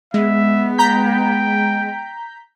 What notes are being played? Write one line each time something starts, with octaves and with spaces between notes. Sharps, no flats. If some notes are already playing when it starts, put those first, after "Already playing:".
G#3 B3 E5
G5 A#5 G6 B6